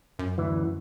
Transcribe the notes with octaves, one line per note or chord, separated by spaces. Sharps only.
F#2
D2 E3